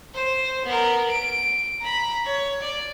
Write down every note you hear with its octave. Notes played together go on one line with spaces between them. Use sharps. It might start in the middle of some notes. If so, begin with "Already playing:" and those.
C5
B3 A#4
D7
A#5 B5
C#5
D5